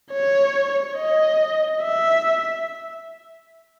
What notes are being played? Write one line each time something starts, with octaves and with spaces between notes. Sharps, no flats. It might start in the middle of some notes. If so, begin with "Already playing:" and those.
C#5
D#5
E5